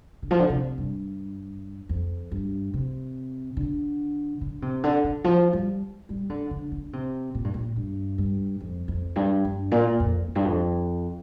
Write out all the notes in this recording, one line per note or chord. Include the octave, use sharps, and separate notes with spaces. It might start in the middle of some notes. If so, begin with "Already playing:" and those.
D3
F3
D3
C3
G2
F2
G2
C3
D3
D3
C3
D3
D3
F3
G3
G3
D3
D3
D3
C3
A#2
G2
A#2
G2
G2
F2
F2
G2
G2
A#2
F2
F2
G2
F2